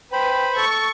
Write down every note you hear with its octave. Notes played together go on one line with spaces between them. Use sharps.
B4 C5 G5 B5
A4 C#6